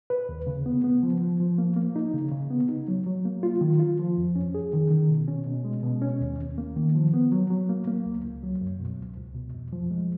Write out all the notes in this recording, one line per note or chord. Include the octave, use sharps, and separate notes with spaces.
B4
D#2
C#3
B3
B3
F3
F3
F3
A#3
A#3
D#4
C#3
C#3
B3
D#4
F#3
F#3
A#3
F4
D#3
F4
F3
F2
C#4
G#4
D#3
D#3
B2
C#4
B2
G#3
B2
C#4
D#2
D#2
A#3
D#3
F3
B3
F#3
F#3
A#3
A#3
C#2
C#2
F#3
F#2
B2
C#2
C#2
B2
F2
F3
G#3